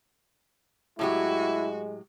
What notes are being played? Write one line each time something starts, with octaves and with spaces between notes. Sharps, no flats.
A2 F#3 G#3 E4 F#4 G4